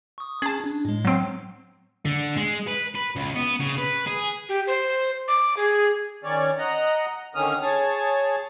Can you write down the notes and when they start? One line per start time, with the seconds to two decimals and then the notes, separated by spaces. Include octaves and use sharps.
0.18 C#6 D#6
0.42 C#4 G#4 A5
0.64 D4
0.85 A2 G#3
1.05 F#3 C4
2.06 D3
2.37 G#3
2.67 B4
2.95 B4
3.16 C#2
3.35 B3
3.60 C#3
3.78 B4
4.06 G#4
4.49 G4
4.67 C5
5.28 D6
5.57 G#4
6.24 D#3 C#4 C#5 D5
6.58 D#5 F#5 A#5
7.35 D3 D#3 C#4 D#6 F6
7.62 G#4 C#5 A5